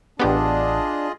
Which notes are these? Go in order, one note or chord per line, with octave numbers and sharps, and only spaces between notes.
A1 B3 D4 F4 G4 G#4 D#5 F#5